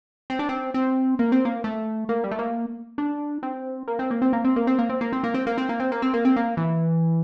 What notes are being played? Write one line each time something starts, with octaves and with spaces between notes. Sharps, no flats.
C4
D4
C4
C4
A#3
C4
A#3
A3
A#3
G3
A3
A#3
D4
C4
A#3
C4
A#3
C4
A#3
C4
A#3
C4
A#3
C4
A#3
C4
A#3
C4
A#3
C4
A#3
C4
A#3
C4
A#3
C4
A#3
E3